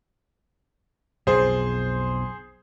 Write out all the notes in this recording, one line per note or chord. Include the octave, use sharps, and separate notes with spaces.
B1 F2 G#4 C5